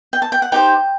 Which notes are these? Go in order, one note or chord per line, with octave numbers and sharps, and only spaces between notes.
G5
A5
G5
F#5
D#4 G4 C5 G5